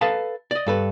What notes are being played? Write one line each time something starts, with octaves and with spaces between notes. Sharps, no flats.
A4 B4 D#5 F5 A5
D5 D#5
G2 A4 B4